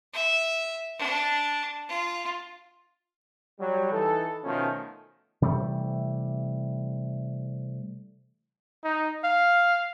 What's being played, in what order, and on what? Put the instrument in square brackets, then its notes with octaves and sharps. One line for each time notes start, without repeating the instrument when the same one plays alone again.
[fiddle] E5
D4
F4
[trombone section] F#3 G3
E3 D#4 A4
B2 D#3 F3 A3 C#4
[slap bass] C3 E3 G3 A3
[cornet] D#4
F5